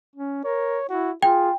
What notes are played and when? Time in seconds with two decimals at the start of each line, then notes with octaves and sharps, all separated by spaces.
0.16 C#4
0.44 A#4 C#5
0.89 E4 F#4
1.23 F4 G#4 G5